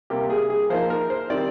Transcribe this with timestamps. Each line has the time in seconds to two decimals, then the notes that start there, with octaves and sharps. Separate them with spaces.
0.10 C3 G3 A#3 G4
0.30 G#4
0.50 G#4
0.70 F3 A#3 D#4 C5
0.90 A#4
1.10 C5
1.30 D#3 G3 C4 D5